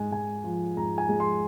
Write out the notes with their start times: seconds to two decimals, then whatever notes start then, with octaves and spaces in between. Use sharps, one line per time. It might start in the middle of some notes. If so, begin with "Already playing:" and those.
Already playing: G#2 G#3 G#5
0.11 G#2 G#5
0.44 F3
0.77 G#2 A#5
0.98 G#5
1.09 G#3
1.20 C6